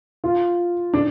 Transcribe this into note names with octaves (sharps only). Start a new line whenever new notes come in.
F4
D4